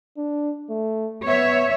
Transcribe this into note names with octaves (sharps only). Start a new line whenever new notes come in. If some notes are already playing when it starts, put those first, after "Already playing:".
D4
A3
B3 C#5 E5